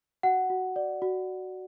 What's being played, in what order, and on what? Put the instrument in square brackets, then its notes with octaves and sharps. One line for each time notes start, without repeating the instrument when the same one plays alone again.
[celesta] F#4 F#5
F#4
D5
F#4